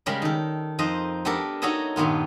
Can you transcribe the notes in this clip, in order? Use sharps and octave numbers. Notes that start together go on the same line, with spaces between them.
C#3 G3 G#3 A#4 B5
D#3 A4
F2 D#4 C5 D#5
G3 B3 D4 A4 A#4
D#4 F#4 A4 C#5 D#5 E5
G2 A#2 D#3 B3 F4